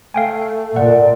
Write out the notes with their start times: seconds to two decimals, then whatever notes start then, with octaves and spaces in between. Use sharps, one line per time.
0.14 A3 F5 G5 G#5
0.76 A#2 D5 F#5